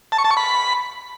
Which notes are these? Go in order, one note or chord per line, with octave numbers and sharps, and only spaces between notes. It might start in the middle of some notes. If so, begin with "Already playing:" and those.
A5
C#6
A5
C#6
B5